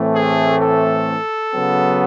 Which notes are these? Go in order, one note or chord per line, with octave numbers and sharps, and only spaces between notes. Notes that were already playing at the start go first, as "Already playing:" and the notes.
Already playing: A2 E3 A3 C4
G#4
A4
C#3 F#3 B3